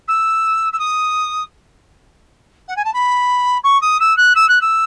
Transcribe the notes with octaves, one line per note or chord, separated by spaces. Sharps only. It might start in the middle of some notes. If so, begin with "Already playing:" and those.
E6
E6
D#6
F#5
G#5
A5
B5
C#6
D#6
E6
F#6
E6
F#6
E6